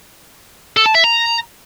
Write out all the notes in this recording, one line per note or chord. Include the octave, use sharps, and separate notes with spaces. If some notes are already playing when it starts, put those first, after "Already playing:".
A4
A5
E5
A#5